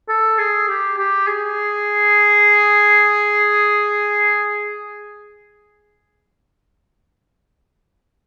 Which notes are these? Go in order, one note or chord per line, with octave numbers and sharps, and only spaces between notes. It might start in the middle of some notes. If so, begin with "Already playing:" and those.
A4
G#4
G4
G4
G#4